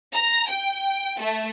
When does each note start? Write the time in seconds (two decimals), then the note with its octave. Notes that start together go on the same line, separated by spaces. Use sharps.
0.14 A#5
0.49 G5
1.19 A3